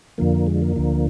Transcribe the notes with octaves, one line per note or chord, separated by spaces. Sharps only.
F2 D3 F3 A#3
G#3
A#3
D2 D3 F3